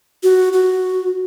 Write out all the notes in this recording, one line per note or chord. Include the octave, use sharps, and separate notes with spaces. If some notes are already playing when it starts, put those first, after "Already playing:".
F#4
F#4